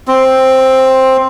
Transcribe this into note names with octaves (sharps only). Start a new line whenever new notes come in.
C4